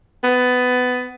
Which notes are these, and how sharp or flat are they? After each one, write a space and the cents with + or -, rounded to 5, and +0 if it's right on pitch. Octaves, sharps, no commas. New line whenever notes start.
B3 +20